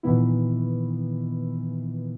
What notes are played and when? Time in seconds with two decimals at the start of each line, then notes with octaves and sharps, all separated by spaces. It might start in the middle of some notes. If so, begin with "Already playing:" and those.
0.03 A#2 D#3 E3 B3 E4